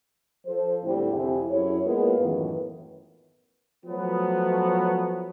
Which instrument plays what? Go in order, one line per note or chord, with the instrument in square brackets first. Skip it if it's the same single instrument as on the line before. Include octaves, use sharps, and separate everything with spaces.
[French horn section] F3 A4 C5
A2 D3 G3 C4 E4
F2 C3 E4 G4 G#4
F#2 E4 G#4 C#5
G#3 A#3 B3 F4 A#4
F#2 A2 D#3 E3 B3
[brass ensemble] F3 F#3 A3 B3